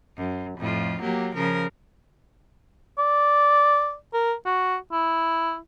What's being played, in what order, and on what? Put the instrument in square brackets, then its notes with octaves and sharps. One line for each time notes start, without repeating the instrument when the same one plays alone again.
[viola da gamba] F#2
F2 A2 F4
F#3 A#3 G4
C#3 F3 A#4
[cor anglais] D5
A#4
F#4
E4